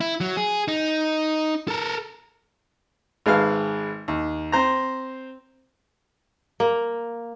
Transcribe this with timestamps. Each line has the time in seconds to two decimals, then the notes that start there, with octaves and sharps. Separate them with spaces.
0.01 E4
0.20 F#3
0.37 G#4
0.68 D#4
1.68 A4 A#4
3.26 G#1 G#3 B4 F5 F6
4.08 D#2
4.52 C4 C5 A#5
6.60 A#3